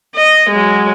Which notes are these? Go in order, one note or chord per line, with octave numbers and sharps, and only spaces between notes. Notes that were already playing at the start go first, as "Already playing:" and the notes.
D#5
F#3 G#3